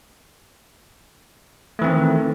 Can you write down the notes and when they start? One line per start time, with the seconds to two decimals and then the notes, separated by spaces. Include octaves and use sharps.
1.79 A3
1.82 E3
1.84 C4
1.87 D#3